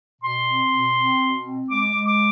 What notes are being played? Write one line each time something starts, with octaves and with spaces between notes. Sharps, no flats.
B2 C6
C4
B2
C4
B2
C4
G#3 D6
G#3
D6